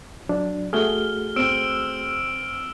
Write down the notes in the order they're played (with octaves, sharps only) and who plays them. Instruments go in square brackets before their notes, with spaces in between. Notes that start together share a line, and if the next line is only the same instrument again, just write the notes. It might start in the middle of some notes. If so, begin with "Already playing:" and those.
[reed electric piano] F#3 D4
[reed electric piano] A3 F#4 G#4 [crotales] F6 G7
[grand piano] C4 G7 [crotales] E6 D7 E7